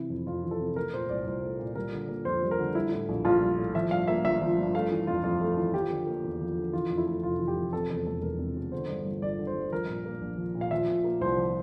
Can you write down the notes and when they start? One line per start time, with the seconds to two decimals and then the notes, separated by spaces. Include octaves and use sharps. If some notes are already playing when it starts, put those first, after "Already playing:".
Already playing: C3 E3 E4
0.10 F2
0.27 F2 F4
0.44 E3
0.51 A4
0.61 C3
0.76 A3 A#4
0.93 A#2 C5
1.09 C2 D5
1.26 C2 C5
1.43 A3
1.60 A#2
1.75 G3 A#4
1.92 D3
2.09 A#3
2.25 F2 C5
2.43 G3
2.51 A#4
2.59 D3
2.75 G3 E4
2.92 A2
3.09 A#1
3.25 A#1 F4
3.42 G3
3.58 A2
3.75 F3 E5
3.91 G2 F5
4.08 A#3 E5
4.24 G1 E5
4.42 F3
4.58 G2
4.74 A3 F5
4.91 E3
5.07 F2 F4
5.24 F2 F4
5.41 A3
5.57 E3
5.74 F3 G4
5.90 D3
6.07 A#3
6.24 E2
6.41 F3
6.57 D3
6.73 E3 F4
6.90 F2
6.98 E4
7.07 A3
7.23 F1 F4
7.39 E3
7.48 G4
7.57 F2
7.73 C3 A4
7.90 E2 A4
8.06 E1 A4
8.22 E1 A#4
8.39 C3
8.56 E2
8.72 D3 C5
8.89 G2
9.06 G1
9.22 G1 D5
9.39 D3
9.47 C5
9.55 G2
9.72 F3 A#4
9.88 A#2
10.06 A#3
10.21 A#1
10.38 F3
10.55 A#2
10.61 F5
10.71 F3 E5
10.88 A#2
11.04 A#3
11.21 C2 C5
11.37 F3